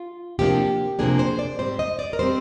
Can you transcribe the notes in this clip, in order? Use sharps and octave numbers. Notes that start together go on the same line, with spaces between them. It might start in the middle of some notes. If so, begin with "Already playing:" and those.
Already playing: F4
C3 F3 A#3 D4 G4
C3 F3 A#3 D4 G#4
C5
D5
G#2 G3 C4 C5
D#5
D5
A#4
G3 C4 C5